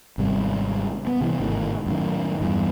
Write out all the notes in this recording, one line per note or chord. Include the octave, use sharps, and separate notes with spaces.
G#1 C3 G3
B3
C3 E3 F#3 C4
G#1 A2 D#3
F#2 A2 D#3
E2 G2